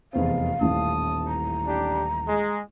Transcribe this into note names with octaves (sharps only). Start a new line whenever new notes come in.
F1 E2 C4 F5
D#1 A1 A5 D#6
A#5
D4 G4
G#3